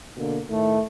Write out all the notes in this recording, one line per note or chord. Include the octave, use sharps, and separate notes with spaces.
B2 D3 A#3
A2 D#3 A3